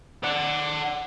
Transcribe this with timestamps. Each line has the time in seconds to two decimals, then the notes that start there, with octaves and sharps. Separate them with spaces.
0.24 D5 F#5